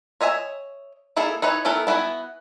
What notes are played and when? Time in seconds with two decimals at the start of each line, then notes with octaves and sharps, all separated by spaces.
0.21 C#5 D#5 E5 G#5
1.16 A#3 E4 G#4 A4
1.42 D#4 E4 B4 C#5
1.65 A3 B3 E4 A4 A#4
1.87 B3 E4 F#4 G#5